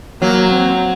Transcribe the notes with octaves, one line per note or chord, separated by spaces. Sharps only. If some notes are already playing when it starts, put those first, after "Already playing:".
F#3 A#3
C4